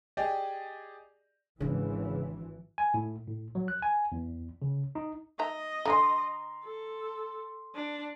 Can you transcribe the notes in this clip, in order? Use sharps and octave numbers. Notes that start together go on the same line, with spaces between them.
G4 G#4 D5 D#5
G#1 G#2 C#3 E3 D4
G#5
A2
A2
F#3
F#6
G#5
E2
C#3
D#4
D#4 D#5 E5 A#5
D3 C#4 G#5 A#5 C6
A4
D4